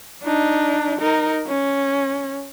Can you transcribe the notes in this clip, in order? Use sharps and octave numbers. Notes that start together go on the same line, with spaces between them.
D4 D#4
D#4 A#4
C#4